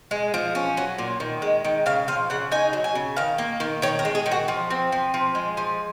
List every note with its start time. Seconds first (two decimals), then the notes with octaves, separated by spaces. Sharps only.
0.11 G#3
0.34 F3
0.55 C#4
0.77 F#3
0.98 A#2
1.20 D#3
1.42 G#3
1.64 D#3
1.86 C#3 F5
2.08 F3 F5
2.30 C#3 F#5
2.52 D#4 G#5
2.73 F#3
2.84 G#5
2.95 C#3
3.17 D#3 F5
3.38 A#3
3.60 D#3
3.82 D#3 C#5
3.99 A#4
4.05 G#3
4.15 G#4
4.26 D#3
4.31 F#4
4.48 F3
4.70 C4
4.92 F3
5.14 F3
5.35 G#3
5.57 F3